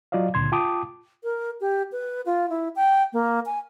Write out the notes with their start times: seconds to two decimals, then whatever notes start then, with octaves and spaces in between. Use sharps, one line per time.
0.12 F#3 F4 D5 D#5 F5
0.34 C#2 A#2 D3 C6 G#6
0.52 F4 G5 A5 D6 D#6
1.24 A#4
1.61 G4
1.92 B4
2.26 F4
2.50 E4
2.76 G5
3.13 A#3
3.46 G#5